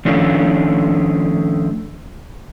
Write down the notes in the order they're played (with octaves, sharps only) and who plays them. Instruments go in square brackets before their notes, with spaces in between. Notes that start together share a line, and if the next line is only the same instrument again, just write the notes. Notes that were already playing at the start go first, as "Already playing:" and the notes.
[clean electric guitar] D#3 F3 A3 C#4 D4 F4